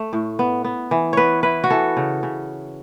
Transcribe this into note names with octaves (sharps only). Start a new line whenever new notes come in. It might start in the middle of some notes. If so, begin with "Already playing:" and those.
Already playing: A3
A2
B3
B3
E3
B3 B4 C#5
E4 B4
F#4
E3 A4
C#3
C#3